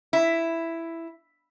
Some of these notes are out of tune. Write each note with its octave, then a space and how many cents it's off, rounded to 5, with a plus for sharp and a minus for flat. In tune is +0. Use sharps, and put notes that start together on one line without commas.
E4 +5